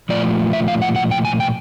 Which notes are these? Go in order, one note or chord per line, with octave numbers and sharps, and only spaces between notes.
A#2 F3 A3 F4 D5
E5
F5
F#5
F#5
G5
G#5
G5